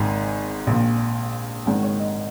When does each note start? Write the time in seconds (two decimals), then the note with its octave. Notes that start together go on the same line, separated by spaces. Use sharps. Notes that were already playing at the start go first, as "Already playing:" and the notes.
Already playing: G#1 G#2 D#3 G#5
0.67 A#1 A#2
1.66 G#1 G#2 D#3 F#5
1.83 C#5
1.99 D#5